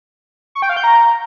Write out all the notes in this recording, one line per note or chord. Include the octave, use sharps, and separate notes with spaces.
C#6
G5
F5
G6
A#5